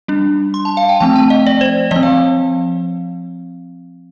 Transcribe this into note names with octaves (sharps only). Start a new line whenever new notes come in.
G3 D4
C6
A5
F5
G5
F3 A3 C4 A5
G5
D#5
D5
C5
F3 C4 D#5
F5